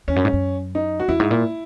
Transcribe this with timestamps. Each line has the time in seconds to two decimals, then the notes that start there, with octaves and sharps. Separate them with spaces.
0.08 E2 C#4
0.16 F#2
0.25 G#2
0.33 F#2
0.75 D#4
1.00 F#4
1.08 E2 E4
1.20 G#2
1.31 A#2